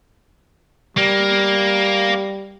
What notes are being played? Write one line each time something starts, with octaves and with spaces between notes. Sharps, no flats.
G3 A#3